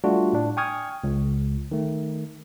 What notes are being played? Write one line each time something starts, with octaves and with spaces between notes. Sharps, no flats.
G3 A3 D4 F4 F#4
A2 D4
G5 G#5 C#6 D#6 F6 G#6
C#2
D#3 A3